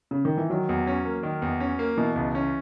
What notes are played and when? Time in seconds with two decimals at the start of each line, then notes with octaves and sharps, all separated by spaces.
0.11 C#3
0.25 D#3
0.38 E3
0.50 D#3 F#3
0.69 E2
0.87 C#4
1.05 A#3
1.23 D#3
1.42 E2
1.60 C#4
1.79 A#3
1.97 B2 E3
2.16 C#2
2.35 C#4